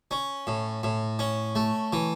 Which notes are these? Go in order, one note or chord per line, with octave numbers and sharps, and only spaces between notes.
C#4
A2
A2
C#4
A3
E3